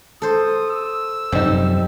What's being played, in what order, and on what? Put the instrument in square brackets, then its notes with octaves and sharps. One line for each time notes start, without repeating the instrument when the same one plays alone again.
[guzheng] A4 C5 [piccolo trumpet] D#6
[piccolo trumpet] E6
[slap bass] F#2 C3 F3 [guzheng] G3 [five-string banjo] C4 D#4